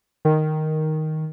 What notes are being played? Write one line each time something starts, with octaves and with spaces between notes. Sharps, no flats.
D#3